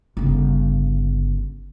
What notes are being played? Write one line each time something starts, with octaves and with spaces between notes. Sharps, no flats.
G1 C#3